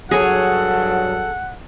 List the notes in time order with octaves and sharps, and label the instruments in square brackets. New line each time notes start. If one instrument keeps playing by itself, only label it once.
[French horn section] G2 F#3 [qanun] G#4 C#5 [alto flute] A4 [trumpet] F#5